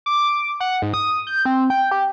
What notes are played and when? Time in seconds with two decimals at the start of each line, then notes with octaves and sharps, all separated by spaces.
0.06 D6
0.60 F#5
0.82 G#2
0.94 D#6
1.27 G6
1.45 C4
1.70 G5
1.91 G4